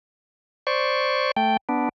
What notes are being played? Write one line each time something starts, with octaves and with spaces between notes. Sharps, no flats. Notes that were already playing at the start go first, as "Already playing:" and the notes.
C5 D5 C#6
A3 G5
B3 D4